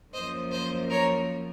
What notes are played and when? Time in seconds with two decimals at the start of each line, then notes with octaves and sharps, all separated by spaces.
0.13 F#2 F3 A#3 C5 D#5
0.51 C5 D#5
0.90 A#4 C#5